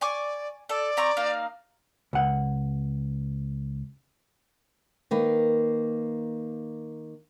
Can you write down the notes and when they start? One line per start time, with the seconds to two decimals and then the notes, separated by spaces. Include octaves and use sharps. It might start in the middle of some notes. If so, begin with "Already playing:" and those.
0.01 D5 G#5 C#6 D6
0.69 A4 D5
0.97 C4 A#5 C#6
1.17 A#3 D#4 F5
2.13 C#2 F#5
5.11 D#3 A#3 B4